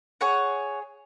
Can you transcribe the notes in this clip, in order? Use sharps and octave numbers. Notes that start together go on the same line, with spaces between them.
G#4 C#5 F#5